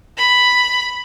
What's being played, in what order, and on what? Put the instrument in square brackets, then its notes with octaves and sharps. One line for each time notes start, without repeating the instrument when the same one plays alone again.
[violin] B5